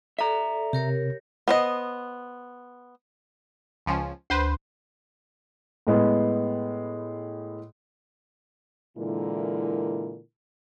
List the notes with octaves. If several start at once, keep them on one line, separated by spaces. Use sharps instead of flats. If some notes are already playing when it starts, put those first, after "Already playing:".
A4 D5 E5 A#5
C3 G4 A#4 C#5
B3 C5 D#5
C#2 F3 C#4
D2 B4 C5 C6
A2 G#3 B3
A#2 D3 E3 G#3 E4 A#4